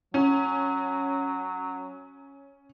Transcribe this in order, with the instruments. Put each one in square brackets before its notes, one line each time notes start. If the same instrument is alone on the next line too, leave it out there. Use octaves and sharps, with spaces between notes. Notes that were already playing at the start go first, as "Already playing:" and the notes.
[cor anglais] F#3 [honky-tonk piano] C#4